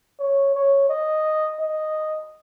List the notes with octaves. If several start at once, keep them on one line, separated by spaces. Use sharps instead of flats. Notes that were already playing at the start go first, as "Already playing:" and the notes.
C#5
C#5
D#5
D#5